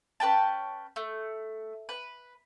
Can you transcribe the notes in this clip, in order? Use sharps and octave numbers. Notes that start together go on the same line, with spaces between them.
C#4 B4 G5 A5
A3
B4